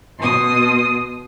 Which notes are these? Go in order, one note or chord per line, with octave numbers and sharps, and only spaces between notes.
B2 C6 D#6